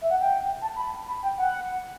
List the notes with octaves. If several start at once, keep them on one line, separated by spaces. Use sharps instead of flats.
E5
F#5
G5
A5
B5
B5
G5
F#5